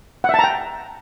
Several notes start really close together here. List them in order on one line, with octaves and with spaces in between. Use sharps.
F#5 E5 A5 A#5 G5